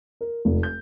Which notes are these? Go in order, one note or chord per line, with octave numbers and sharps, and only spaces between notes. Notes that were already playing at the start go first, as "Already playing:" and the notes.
A#4
F1
G6